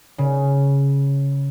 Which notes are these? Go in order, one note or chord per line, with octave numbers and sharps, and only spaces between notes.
C#3